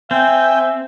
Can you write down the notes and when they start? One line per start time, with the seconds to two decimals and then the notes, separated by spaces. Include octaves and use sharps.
0.11 C4 E5 G5 G#5